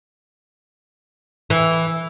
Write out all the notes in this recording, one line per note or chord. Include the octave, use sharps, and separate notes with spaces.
E3